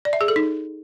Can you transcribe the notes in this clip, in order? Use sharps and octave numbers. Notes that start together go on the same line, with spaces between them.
D5
E5
G#4
A4
D#4